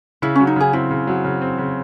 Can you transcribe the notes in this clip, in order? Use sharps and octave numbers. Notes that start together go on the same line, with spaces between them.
C#3 E4
F#3 C#4
D#4
C#3 G#4
C4 E4
C#3
F#3
C#3
C4
C#3